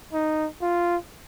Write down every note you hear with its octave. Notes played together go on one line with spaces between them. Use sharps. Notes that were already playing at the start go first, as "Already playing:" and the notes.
D#4
F4